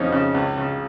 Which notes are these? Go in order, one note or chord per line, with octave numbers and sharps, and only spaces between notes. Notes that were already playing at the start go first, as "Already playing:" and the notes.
Already playing: F2 C#3 C4 C#4 D#4
C#3
C#2
C#3